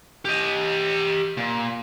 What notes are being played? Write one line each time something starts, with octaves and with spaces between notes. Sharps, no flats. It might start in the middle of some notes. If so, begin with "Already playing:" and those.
G4 D#5
A#2